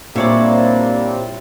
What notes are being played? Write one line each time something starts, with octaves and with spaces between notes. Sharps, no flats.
A#2 G3 A#3 C4 D4 E4 C#5 D5